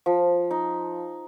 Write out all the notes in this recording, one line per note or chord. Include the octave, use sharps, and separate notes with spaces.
F3
D#4